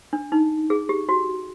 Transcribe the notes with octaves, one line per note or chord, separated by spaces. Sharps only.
D4
D#4
G#4
G4
F#4